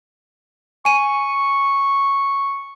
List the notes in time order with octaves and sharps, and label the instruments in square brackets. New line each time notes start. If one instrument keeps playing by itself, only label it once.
[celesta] G#5 D#7 [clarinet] C#6